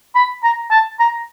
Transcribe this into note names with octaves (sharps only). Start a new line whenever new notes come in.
B5
A#5
A5
A#5